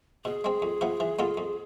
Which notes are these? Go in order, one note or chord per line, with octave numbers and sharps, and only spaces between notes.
B2 G#4
G#3 C4
F2
C3 F3 B3
E3
G#3 B3 F4 A4
F2